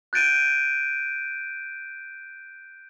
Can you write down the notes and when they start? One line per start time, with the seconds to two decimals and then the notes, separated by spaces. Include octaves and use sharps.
0.13 F#6 G6 A6 D7 D#7